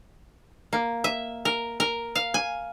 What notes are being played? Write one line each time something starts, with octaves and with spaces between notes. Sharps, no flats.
A#3
E5
A#4
A#4
F5
G#5